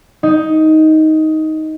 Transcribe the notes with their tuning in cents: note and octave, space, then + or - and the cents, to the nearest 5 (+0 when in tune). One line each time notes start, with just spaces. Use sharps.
D#4 +10